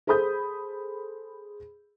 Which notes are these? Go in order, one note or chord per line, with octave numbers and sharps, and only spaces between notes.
G#4 A4 C5 B5 D#6 G6